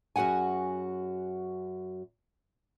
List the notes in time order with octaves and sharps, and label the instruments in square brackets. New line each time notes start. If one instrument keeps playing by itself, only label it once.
[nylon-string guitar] F#2 F#4 G#4 F#5 G#5